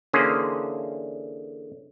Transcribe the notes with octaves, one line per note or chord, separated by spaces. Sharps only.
D3 E3 A#3 C#4 G#4 C5